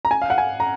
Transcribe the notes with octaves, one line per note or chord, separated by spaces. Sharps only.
A#5
G#5
F5
F#5
G#5
A#5